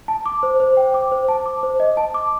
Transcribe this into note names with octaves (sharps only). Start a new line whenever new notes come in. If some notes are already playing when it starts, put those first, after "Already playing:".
A5
D6
C5
C5
G5
D6
C5
A5
D6
C5
D#5
A5
D6